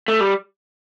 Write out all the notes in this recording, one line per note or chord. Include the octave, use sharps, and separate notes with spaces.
A3
G3